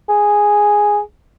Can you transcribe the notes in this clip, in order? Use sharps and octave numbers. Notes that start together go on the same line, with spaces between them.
G#4